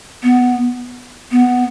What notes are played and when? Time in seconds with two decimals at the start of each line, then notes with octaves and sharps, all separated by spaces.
0.23 B3
1.32 B3